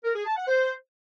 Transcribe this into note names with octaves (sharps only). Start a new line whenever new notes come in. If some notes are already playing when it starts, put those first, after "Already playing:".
A#4
G#4
A5
F#5
C5